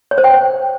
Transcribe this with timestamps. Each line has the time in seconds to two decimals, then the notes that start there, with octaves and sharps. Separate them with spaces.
0.11 C#5
0.18 C5
0.24 G5